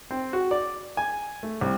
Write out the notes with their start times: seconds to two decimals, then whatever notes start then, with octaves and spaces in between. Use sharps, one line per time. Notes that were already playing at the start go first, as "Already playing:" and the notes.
0.11 C4
0.33 F#4
0.51 D5
0.97 G#5
1.43 A3
1.61 C2